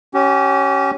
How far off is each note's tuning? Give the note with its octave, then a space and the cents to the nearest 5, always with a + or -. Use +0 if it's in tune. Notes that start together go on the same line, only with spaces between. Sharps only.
C#4 +0 G4 -35